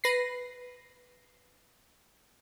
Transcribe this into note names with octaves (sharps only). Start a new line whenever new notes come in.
B4 A#6 C7